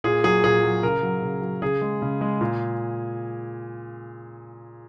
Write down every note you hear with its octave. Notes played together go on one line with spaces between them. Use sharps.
A#2 G#4
F#3 G#4
A#2 G#4
F#3
C#3 A#4
F#3
C#3
F#3
C#3 G#4
G#3
C#3
G#3
A#2